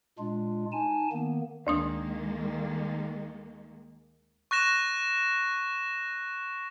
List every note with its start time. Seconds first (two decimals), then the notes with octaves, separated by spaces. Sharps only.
0.19 A#2 G#3 D4 F4
0.72 D#4 G#5 A5
1.12 D#3 A#3 B3
1.67 D2 D#3 G#3 A#3 D4 D#6
4.51 C#6 F#6 A#6 E7